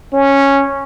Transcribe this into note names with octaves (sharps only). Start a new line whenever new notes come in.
C#4